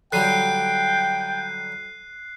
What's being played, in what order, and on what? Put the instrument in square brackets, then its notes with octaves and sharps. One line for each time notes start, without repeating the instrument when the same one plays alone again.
[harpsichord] D3 F#3 G3 [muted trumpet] G5 [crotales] F#6 C7 D#7